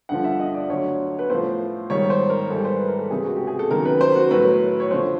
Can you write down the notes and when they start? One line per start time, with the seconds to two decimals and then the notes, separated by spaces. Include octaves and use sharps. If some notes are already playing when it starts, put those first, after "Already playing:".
0.09 G2 D3 F3 F#5
0.24 E5
0.40 D#5
0.54 D5
0.69 D2 D3 F#3 C#5
1.19 B4
1.30 A2 F3 C5
1.90 G#2 D#3 G3 C#5
2.10 C5
2.30 A#4
2.50 G#2 E3 G3 A4
2.65 C5
2.76 B4
2.88 A#4
2.99 A4
3.10 C#2 C3 E3 G#4
3.24 F#4
3.36 G4
3.47 G#4
3.59 A4
3.70 F#2 D#3 F#3 A#4
3.85 B4
4.01 C5
4.16 F#4
4.31 A2 F#3 B4
4.80 C#5
4.91 F2 D3 F3 C5